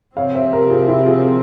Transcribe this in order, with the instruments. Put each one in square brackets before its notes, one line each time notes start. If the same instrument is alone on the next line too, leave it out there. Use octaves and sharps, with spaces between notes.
[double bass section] C3 F3 C4 [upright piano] C#5 F5
[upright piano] C5 E5
G4 A#4
F4 G#4
E4 G4
F4 G#4